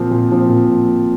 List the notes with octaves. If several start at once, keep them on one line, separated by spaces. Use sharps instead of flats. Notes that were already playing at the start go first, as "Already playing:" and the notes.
Already playing: A#2 F3 C4
A#2
F3 C4
A#2